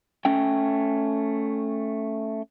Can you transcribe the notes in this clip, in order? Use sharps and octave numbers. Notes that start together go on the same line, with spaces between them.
A3 C#4 G5